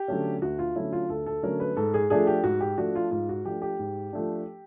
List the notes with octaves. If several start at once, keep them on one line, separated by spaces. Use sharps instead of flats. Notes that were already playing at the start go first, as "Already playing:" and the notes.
Already playing: G4
D3 F#3 A3 C#4
D2 F#4
F4
D3 F#3 A3 C#4 E4
F4
D2 A4
A4
D3 F#3 A3 C#4 A#4
B4
G#2 A4
G#4
F3 A3 D4 G#4
G4
G#2 F#4
G4
F3 A3 D4 F#4
F4
G#2 F4
F#4
F3 A3 D4 G4
G4
G#2
F3 A3 D4